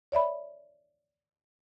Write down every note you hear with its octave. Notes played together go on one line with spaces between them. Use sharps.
C#5 D5 E5 B5